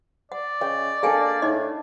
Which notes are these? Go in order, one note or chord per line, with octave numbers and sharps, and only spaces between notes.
D5 F#5
C#3 D#5 G5
A#3 D4 G#4 A4 G5 G#5 D#6
A2 D#4 D#5